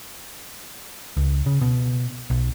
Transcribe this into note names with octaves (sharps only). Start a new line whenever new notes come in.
C#2
C#3
B2
B1